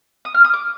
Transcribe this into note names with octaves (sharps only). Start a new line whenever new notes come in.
D#6
F6
D#6
D6